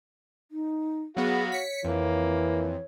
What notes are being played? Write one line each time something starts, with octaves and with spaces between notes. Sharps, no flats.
D#4
F#3 B3 F#4 G#4 F5
C#5 B6 C#7
F2 E3 A#3